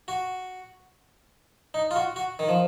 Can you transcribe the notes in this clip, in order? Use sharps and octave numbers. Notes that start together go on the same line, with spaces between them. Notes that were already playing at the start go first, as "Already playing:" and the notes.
F#4
D#4
F4
F#4
F#4
D#3
F3